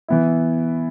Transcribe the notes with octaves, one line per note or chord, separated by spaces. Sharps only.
E3 B3 E4